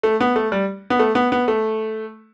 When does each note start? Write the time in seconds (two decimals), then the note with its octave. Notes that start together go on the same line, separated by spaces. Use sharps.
0.03 A3
0.20 B3
0.36 A3
0.52 G3
0.90 B3
0.99 A3
1.15 B3
1.32 B3
1.48 A3